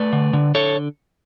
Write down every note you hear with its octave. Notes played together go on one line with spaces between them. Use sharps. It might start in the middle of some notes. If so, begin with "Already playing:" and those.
Already playing: A3 B4 D5
D3
D3
D3 A4 C#5